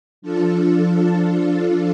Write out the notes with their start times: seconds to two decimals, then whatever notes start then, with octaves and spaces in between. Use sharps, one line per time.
0.22 F3 D4 F4 A4
1.16 F3 D4 F4 A4